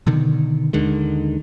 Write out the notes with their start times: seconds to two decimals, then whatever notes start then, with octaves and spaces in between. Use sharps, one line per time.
0.07 B2 D3 D#3
0.73 D#2 D3 D#3 G#3